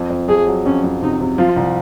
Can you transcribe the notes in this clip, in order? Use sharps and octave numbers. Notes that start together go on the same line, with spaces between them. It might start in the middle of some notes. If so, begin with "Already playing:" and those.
Already playing: F2
F2
F2 G#4
F#3
F2 C#4
F2
C3 D#4
C3
F3 F4
C2